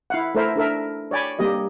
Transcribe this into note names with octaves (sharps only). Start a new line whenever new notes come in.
E4 F5 F#5
A3 E4 A4 A#4 C5 E5
D4 A4 A#4 E5
C#5 D5 G5 G#5 B5
G3 A#3 G4 D#5